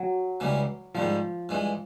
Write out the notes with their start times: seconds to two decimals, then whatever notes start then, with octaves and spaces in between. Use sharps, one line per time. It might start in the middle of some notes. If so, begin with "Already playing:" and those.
Already playing: F#3
0.40 C#2 C#3 E3 G3
0.94 G#2 D#3 F3 G3
1.49 G2 E3 G#3